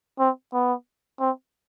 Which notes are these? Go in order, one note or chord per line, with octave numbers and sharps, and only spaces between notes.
C4
B3
C4